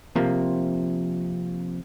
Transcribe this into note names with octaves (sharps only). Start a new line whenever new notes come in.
C3 F3 A#3